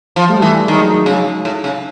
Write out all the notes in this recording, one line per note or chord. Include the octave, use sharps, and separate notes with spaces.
F3
G3 A3
E3
D#3 F#3 G#3
C#3
A2
C#3